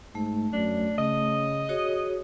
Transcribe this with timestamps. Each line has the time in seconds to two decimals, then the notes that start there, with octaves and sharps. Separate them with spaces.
0.15 G#2 A3
0.53 F#2 D4
0.98 C#3 D#5
1.69 F#4 G#4 C#5